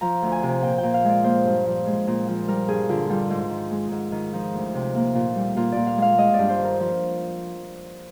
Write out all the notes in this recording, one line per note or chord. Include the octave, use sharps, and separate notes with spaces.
F3 A#5
D2
G#5
C3
A#2 G5
G5
A#2
F5
G#3 D5
A#3 C5
G2
F3
G#3
A#2
F3
G3 A#4
G2 G#4
D3 F4
G3 F4
G#2
D#3
G#3
G#2
D#3
F3 D#4
D2
C3
A#3
A#2
G3
A#2 F4
A#2 D5
F5
G#3 F5
G#3 D#5
G2 D5
C5
D#3
A#4
F3